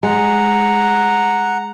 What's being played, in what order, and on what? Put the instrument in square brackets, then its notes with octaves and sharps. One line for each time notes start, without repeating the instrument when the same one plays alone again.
[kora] G#3 [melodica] F#5 A#5